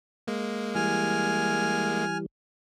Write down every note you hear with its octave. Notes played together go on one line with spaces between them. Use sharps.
G#3 A#3
E3 G3 G#5 F6